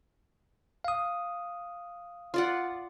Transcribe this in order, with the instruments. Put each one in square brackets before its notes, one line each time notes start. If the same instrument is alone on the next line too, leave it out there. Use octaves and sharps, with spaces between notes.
[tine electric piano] F5 D#6
[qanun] F4 D5 F#5